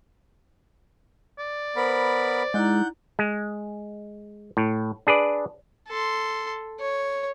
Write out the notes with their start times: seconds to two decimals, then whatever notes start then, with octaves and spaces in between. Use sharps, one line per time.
1.39 D5
1.76 B3 A#4 C5 B5
2.54 G#3 D#4 E4 F#5 A#5 G6
3.19 G#3
4.57 A2
5.07 D4 G#4 B4 D5
5.88 A4 C6
6.80 C#5